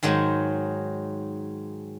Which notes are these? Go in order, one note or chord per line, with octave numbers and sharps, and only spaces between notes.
G#2 D#3 F#3 G#3